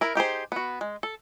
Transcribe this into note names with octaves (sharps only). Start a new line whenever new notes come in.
E4 A#4
D#4 G4 G#4 C5
B3 F#4
G#3
A4